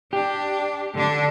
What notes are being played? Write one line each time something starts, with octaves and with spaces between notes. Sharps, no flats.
D4 G4
D3 D4